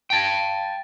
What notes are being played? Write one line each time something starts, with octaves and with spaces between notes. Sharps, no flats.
G5 A5